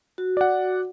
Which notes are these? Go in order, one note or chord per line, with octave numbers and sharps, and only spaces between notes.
F#4
D5 F#5